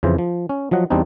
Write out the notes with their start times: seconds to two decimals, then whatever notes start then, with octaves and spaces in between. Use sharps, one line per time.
0.03 F2 C#3 E3 C5
0.18 F3
0.49 C#4
0.71 F3 F#3 D#5 F#5
0.90 E2 G3 C4 D4 D#4